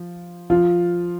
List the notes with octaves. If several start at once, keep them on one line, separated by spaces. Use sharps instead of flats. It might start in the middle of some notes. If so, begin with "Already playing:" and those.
Already playing: F3
F3 F4